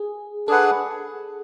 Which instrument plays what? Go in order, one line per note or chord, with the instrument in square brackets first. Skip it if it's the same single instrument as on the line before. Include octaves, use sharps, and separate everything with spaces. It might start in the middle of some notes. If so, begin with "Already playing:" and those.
Already playing: [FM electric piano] G#4
[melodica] D4 G#4 B4 F#5 [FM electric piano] A4